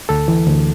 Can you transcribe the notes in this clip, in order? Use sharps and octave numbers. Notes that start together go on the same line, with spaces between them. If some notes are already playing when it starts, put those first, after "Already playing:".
D2 A4
E3
D2